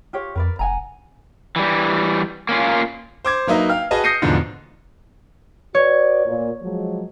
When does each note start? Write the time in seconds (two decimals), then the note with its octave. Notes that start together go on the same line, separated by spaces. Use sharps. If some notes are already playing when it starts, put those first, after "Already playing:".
0.13 F4 G4 C#5
0.35 F2 A#4 B4 D5
0.59 F1 F#5 G#5 A#5
1.56 E3 G3
2.49 A#3 C#4 F4
3.25 C5 D6 G#6
3.47 F#3 A#3 D#4 B4 E5
3.69 F5 G5 F6
3.91 F#4 G#4 B4 D#5 A5
4.04 D#6 G6 A#6 C7 C#7 D#7
4.22 E2 G#2 B2 D3 F3
5.75 F#4 B4 C#5 D5
6.26 A#2
6.62 F3 F#3 G#3